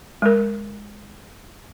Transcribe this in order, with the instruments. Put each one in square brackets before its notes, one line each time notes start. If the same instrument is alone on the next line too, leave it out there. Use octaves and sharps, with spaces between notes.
[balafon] G#3 A#4